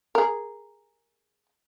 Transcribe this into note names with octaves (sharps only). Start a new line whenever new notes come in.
G#4 A#4